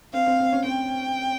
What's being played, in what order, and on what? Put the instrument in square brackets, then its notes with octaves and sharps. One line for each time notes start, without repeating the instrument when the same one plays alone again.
[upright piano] C4 [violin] F5
[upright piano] C4
C4
C#4
[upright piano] C4 [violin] G5